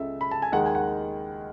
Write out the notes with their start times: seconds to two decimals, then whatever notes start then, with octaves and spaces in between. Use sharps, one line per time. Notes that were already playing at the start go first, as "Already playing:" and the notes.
Already playing: C#2 C#3 G#3 A4 E5
0.21 B5
0.31 A5
0.42 G#5
0.52 D#2 D#3 G#3 D#4 F#5
0.66 G#5
0.75 F#5